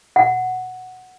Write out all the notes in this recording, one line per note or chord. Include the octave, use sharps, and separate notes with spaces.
F#5